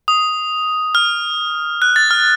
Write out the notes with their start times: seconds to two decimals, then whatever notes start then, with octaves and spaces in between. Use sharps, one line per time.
0.08 D#6
0.95 F6
1.82 F#6
1.96 A6
2.11 F6